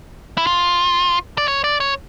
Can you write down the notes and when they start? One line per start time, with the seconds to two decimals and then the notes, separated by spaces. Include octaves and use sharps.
0.38 E4
0.47 F4
1.38 D5
1.48 C#5
1.64 D5
1.80 C#5